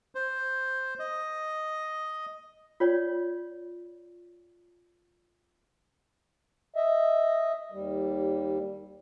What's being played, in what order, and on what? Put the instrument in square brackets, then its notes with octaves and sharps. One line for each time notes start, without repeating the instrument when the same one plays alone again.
[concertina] C5
D#5
[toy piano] F4 C#5 D5
[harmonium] D#5 E5
D#2 G3